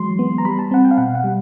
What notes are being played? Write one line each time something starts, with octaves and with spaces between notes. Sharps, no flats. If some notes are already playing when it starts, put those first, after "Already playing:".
Already playing: E3 F#3 G#3 C6
B3
A#5
G3 B5
A5
C4 F#5
G5
F5
B2 F#5
F#5
G3